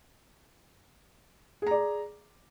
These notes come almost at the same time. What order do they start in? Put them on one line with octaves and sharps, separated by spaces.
G#4 A#5 D5